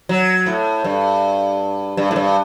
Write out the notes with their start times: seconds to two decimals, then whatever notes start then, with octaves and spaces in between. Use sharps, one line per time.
0.09 F#3
0.46 A2
0.84 G2
1.97 G2
2.11 A2
2.16 G2